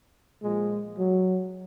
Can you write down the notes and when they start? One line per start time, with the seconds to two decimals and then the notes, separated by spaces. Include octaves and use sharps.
0.42 A#2 F3 G#3
0.98 F#3